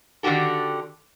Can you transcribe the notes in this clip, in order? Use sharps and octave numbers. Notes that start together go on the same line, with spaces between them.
D3 D#3 F#4 G4 A4